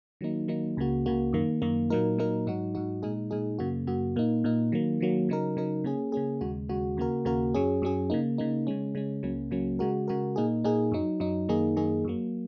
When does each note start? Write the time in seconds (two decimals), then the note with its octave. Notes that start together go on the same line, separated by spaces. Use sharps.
0.21 D#3 F#3 A#3 D#4
0.48 D#3 F#3 A#3 D#4
0.77 C#2 C#3 A#3 F#4
1.06 C#2 C#3 A#3 F#4
1.33 F#2 D#3 A#3
1.62 F#2 D#3 A#3
1.90 A#2 F#3 A#3 D#4 A#4
2.18 A#2 F#3 A#3 D#4 A#4
2.47 G#2 F#3 D#4 F#4
2.75 G#2 F#3 D#4 F#4
3.03 A#2 G#3 D#4 G#4
3.31 A#2 G#3 D#4 G#4
3.59 F#2 C#3 A#3 F#4
3.87 F#2 C#3 A#3 F#4
4.16 A#2 A#3 D#4
4.44 A#2 A#3 D#4
4.72 D#3 F#3 A#3
5.01 D#3 F#3 A#3
5.29 C#3 F#3 D#4 A#4
5.57 C#3 F#3 D#4 A#4
5.84 C#3 A#3 C#4 G#4
6.12 C#3 A#3 C#4 G#4
6.41 D#2 C#3 G#3 F#4
6.69 D#2 C#3 G#3 F#4
6.97 D#2 C#3 A#3 F#4 A#4
7.25 D#2 C#3 A#3 F#4 A#4
7.54 F#2 F#3 C#4 G#4
7.82 F#2 F#3 C#4 G#4
8.10 C#3 A#3 D#4
8.38 C#3 A#3 D#4
8.67 C#3 G#3 C#4
8.95 C#3 G#3 C#4
9.23 C#2 C#3 F#3 A#3 C#4
9.51 C#2 C#3 F#3 A#3 C#4
9.79 C#3 G#3 F#4 A#4
10.08 C#3 G#3 F#4 A#4
10.36 A#2 A#3 D#4 G#4
10.64 A#2 A#3 D#4 G#4
10.92 F#2 F#3 D#4
11.20 F#2 F#3 D#4
11.49 F#2 D#3 A#3 D#4 G#4
11.76 F#2 D#3 A#3 D#4 G#4
12.05 F#2 F#3 A#3